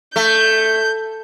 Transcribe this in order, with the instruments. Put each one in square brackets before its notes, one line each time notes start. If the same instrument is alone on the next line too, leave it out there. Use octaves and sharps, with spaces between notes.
[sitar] A3 [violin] G6